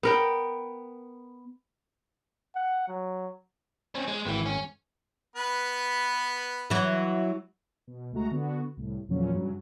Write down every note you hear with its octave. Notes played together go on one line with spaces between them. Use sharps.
B3 A#4 G5
F#5
F#3
C4 C#4
G#3
G#1 E3 G5
C#4
B3 B4
E3 F#3
B2
C#2 G#3 A3 F#4 A#5
D3 B3 F#4
C2 A2
E2 A#2 C#3 F3 F#3 C#4
G2 C#3 F#3